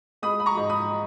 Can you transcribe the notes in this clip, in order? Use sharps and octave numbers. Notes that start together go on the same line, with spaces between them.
G#3 B5 D#6
B5
A#5 C#6
G#2
B5 D#6